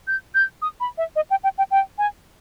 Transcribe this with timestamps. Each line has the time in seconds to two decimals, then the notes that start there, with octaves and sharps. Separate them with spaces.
0.07 G6
0.35 G6
0.62 D#6
0.80 B5
0.98 E5
1.16 D#5
1.30 G5
1.43 G5
1.58 G5
1.71 G5
1.98 G#5